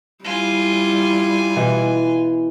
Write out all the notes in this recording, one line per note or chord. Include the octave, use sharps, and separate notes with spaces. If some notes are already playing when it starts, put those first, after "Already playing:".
G3 E4 F4 G#5
B2 E3 B4